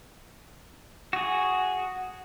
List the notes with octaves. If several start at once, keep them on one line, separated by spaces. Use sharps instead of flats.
F#4 G#4